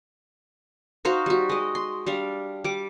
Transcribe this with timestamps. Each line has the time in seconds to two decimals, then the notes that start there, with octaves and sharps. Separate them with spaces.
1.05 D#4 F#4 C5 F5
1.26 G3 F#4
1.49 G#3 D#5
1.75 C6
2.06 G3 D4 F5
2.64 G3 D6